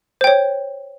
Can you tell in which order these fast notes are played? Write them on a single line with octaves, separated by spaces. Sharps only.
C5 G5 C#5